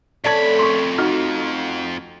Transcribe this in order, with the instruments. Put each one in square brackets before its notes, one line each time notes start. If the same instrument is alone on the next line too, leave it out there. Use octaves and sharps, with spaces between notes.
[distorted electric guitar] F2 B5 [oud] A3 C#4 [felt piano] D5 A5 G#6
[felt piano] C6 C#6
D#4 F#4 F6